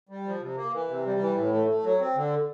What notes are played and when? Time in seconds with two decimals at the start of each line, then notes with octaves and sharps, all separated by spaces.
0.09 G3
0.25 F3
0.40 C3
0.56 A#3
0.73 E3
0.88 C3
1.05 G3
1.20 E3
1.36 A2
1.52 A3
1.68 A3
1.83 F#3
1.99 C4
2.15 D3